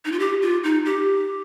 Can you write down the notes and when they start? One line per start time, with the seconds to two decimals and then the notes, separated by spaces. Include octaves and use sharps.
0.05 D#4
0.12 F4
0.19 G4
0.42 F4
0.64 D#4
0.85 G4